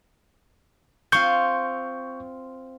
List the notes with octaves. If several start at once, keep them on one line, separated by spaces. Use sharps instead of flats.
C4 F4 C#6 G6